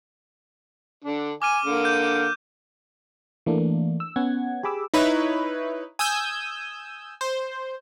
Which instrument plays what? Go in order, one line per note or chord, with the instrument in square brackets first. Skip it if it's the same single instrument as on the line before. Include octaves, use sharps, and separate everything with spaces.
[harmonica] D3 D4
[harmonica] G#5 [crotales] D6 F6 D#7
[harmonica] D3 A#3
[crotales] F6 G6
[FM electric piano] E3 A3 A#3 D4
E6
B3 C#4 F#5 G#6
G4 G#4 B5 D6 E6
[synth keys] D#4 E4 B4 C#5
G#5 D#6 E6 G6
C5